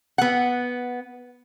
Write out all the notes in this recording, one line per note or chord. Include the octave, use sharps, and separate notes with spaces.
B3 F#5